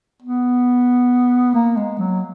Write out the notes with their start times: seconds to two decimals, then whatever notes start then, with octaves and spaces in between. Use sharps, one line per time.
0.22 B3
1.55 A#3
1.77 G#3
1.99 F#3